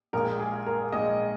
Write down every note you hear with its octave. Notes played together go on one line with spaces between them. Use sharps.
A#1 A#2 G#3 A#4
G#4
A#4
A#1 A#2 G#3 D#5